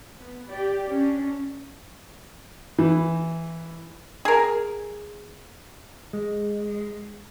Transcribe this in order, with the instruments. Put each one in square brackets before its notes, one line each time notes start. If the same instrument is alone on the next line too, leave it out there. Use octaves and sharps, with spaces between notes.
[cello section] B3
G4 D5
C#4 D4
[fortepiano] E3
[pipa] G#4 A#4
[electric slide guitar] G#3